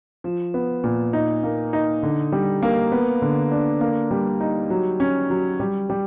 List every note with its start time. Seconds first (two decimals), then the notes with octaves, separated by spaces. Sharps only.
0.24 F3
0.54 B3
0.84 A#2
1.13 D#4
1.43 A#3
1.73 D#4
2.03 D3
2.32 G3
2.63 A#3
2.92 B3
3.22 D3
3.52 D4
3.81 A#3
4.11 G3
4.41 D#4
4.70 F#3
5.00 C#4
5.30 F#3
5.60 G3
5.90 G3